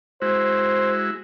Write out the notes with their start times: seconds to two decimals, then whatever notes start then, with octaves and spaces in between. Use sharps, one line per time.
0.22 G#3 E4 F#4 C5